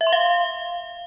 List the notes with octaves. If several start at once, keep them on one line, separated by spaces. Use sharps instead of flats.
E5
C6
F5